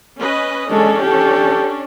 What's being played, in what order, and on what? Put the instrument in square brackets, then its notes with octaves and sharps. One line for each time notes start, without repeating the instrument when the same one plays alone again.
[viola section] C#4 B4 D#5
[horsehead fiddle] G#3 A4 [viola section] C#4 D4
[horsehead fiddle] G4 A4